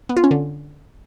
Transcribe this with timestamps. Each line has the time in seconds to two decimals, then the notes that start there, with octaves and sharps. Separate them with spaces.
0.09 B3
0.17 F4
0.24 C#4
0.31 D3